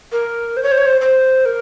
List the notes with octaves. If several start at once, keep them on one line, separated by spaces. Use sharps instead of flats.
A#4
C5
C#5
C5
C#5
C5
C5
A#4